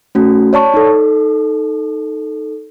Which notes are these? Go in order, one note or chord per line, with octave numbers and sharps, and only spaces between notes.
A3 C#4 F#4
C#5 D5 A5 C#6
D#4 A4